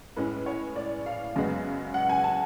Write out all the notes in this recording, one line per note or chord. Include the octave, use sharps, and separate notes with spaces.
A2 G#3 C#4 B4
C#5
D5
F5
F#2 C#3 G#3 B3
F#5
G#5
A5